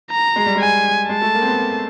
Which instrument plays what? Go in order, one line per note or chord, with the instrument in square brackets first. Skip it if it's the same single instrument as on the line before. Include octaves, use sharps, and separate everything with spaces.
[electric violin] A#5
[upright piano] G#3
G3
[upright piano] G#3 [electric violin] G#5
[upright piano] G#3 [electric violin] A5
[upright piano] A3
A#3
C4
B3
A#3